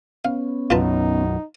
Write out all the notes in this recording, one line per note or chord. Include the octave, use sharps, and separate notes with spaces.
B3 C#4 F5
B1 F#2 D#4 F4 B4 A5